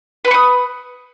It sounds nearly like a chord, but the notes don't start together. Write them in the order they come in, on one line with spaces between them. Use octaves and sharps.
B4 B5 C#6 D#6